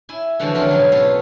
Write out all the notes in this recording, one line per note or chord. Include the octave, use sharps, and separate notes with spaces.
E4 G#5
D3 E3 F3 G#3 F#4
D3 C4 C#4 F4 A#4
G#2 B2 F#3
B3 F4 G#4 A4 C#5